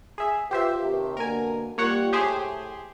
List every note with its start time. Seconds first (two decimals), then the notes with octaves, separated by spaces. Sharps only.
0.18 G#4 E5
0.51 F4 G4 B4 C5 E5
0.83 D#2 C3
1.17 B2 D3 A#3 A#4 G#5
1.78 G3 A#3 F4 G4 C#5 F#5
2.13 A2 G4 G#4 C5